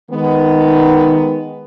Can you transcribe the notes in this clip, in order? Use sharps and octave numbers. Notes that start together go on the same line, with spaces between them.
D#3 G#3 B3